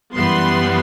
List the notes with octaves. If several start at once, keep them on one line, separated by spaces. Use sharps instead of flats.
F#2 E3 G3 B3 C6